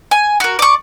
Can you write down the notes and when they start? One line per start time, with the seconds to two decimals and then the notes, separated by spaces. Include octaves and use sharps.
0.11 G#5
0.40 F#4 A#4
0.59 D5 C#6